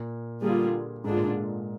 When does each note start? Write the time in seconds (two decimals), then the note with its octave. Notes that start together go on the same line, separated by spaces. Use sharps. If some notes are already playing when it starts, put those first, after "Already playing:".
Already playing: A#2
0.41 D3 G3 A#3 F4 G#4
1.04 G#2 D3 G#3 D4 F4 G#4
1.17 A#2
1.28 G#2